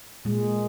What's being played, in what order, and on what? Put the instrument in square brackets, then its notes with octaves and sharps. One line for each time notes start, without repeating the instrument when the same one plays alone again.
[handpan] A#2 G#3